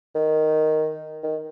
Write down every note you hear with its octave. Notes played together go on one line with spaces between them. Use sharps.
D#3
D#3